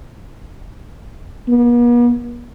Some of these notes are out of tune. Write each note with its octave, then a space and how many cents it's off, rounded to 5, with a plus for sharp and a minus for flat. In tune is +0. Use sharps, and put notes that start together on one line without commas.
B3 -45